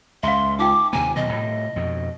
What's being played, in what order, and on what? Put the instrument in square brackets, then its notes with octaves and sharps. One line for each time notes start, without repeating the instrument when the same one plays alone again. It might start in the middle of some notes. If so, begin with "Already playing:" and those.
[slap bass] C#2 [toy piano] E5 F5 [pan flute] C6
[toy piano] D#4 F4 G5 [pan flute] D6
[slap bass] D#2 C3 A#3 [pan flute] G#5
[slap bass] B2 D#3 F#3 [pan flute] D#5
[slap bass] A2 C3 [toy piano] B5
[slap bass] F2 B2